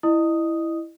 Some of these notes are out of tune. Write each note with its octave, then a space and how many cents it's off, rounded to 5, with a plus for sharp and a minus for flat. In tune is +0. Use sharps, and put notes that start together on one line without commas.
E4 +0 D#5 -30 D#6 +0